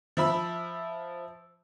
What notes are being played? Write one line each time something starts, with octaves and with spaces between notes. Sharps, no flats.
F3 E5 B5 E6